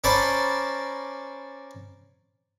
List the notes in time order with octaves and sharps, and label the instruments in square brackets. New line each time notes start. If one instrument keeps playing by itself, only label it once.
[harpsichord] C#4 A#4 C5 D5 A5 B5